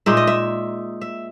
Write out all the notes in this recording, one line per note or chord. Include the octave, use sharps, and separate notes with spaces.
A#2 G#3 D#4 E5
D#5
E5
E5